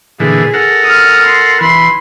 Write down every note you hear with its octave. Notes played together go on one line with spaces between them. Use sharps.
A#2 D3 E3 G#4
A4 A#4 F#5
D#6 F6
C6
E3 B5 C6